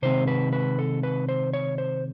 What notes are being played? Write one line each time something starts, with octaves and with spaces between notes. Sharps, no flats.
C3 D#3 G#3 C4 C5
B4
B4
A4
B4
C5
C#5
C5